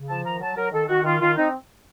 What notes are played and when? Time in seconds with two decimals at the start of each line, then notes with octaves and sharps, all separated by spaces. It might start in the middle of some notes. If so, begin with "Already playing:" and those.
Already playing: C#3
0.09 F3 A5
0.25 D#3 A#5
0.41 F#3 A5
0.57 F#3 A#4
0.72 D#3 A4
0.89 D#3 F#4
1.04 D#3 F4
1.20 D#3 F4
1.37 C4 D#4